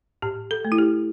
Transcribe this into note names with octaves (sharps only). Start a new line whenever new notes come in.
A2 G4
A4
A3
E4
G4